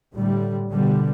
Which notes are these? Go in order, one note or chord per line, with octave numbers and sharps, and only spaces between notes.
A2 D3 G3
B2 D3 G3